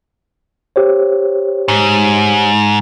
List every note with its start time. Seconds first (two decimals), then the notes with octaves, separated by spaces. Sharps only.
0.76 G4 C5 C#5
1.68 G#2